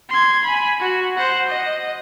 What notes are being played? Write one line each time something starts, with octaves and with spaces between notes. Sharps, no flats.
C6 G#6
G#5 B5
F#4
C5 F#5
D#5